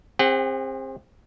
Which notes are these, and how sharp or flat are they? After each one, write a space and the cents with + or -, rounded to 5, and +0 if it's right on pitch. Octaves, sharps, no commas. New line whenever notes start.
C4 +20 G#4 -45 F#5 +25